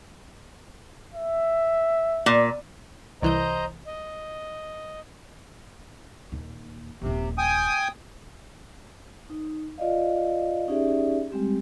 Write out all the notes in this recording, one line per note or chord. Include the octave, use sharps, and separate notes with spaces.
E5
A#2
C2 E3 C5 D#5 A#5 G6
D#5
D#2 A#2
D#1 A#1 C3
G5 G#5 D#6
D#4
F4 D5 D#5 F5
C#4 D#4 G4 G#4 D5 E5
G3 G#3 C4 G4